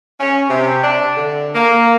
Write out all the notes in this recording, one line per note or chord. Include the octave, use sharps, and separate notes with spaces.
C#4
C3
D4
D3
A#3